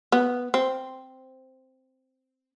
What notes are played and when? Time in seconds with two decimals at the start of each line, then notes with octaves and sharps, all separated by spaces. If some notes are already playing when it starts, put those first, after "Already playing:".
0.12 B3
0.54 C4